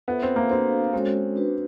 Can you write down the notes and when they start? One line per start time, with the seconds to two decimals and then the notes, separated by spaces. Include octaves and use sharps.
0.08 B3 F4 A4 C5 E5
0.23 C4
0.36 A#3
0.51 C4 D4 F#4 A4 C5 F5
0.93 G#3 C4 C#4 F#4 A4 C#5
1.36 D4 F#4 B4